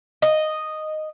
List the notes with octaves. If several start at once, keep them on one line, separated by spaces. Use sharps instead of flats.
D#5